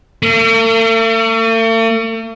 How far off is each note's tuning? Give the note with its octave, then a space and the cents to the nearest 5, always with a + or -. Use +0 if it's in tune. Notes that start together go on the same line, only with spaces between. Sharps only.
A3 +45